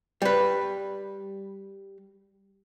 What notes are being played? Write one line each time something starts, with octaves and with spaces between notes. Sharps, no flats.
G3 B4